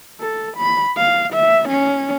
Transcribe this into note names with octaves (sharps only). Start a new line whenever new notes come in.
A4
B5
F5
E5
C#4